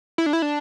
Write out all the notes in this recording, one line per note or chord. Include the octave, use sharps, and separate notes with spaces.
E4
D4
E4
D4